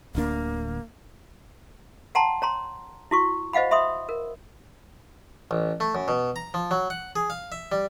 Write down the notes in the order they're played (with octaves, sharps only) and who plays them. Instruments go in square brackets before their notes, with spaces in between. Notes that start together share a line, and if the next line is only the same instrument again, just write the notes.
[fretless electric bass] D1 D2 D4 [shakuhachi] A#3
[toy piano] F#5 G5 A5 A#5 C6
C#5 A#5 C6
E4 F#4 C#6
C5 D#5 F5 F#5 B5
E5 B5 C6 D#6
A#4
[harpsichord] A1
A3
F#2
B2
A#5
F3
F#3
F#5
G#4
F5
E5
G3